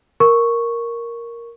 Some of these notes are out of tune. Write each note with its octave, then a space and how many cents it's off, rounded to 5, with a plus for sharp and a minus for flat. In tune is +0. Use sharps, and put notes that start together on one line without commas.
A#4 +0 C#6 +0